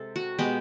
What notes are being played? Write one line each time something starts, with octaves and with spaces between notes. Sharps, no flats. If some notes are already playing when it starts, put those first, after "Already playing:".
Already playing: C3 G#3 A4
F#4
B2 G#3 B3 G4